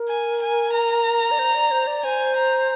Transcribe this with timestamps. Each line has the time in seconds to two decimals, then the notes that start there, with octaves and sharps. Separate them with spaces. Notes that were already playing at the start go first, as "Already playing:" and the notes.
Already playing: A#4
0.09 G#5
0.42 G#5
0.74 A#5
1.31 D5
1.39 C5
1.55 D5
1.71 C5
1.87 D5
2.04 C5 G#5
2.36 A#5